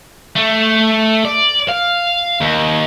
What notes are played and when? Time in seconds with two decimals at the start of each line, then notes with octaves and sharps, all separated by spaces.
0.36 A3
1.25 D5
1.69 F5
2.41 D#2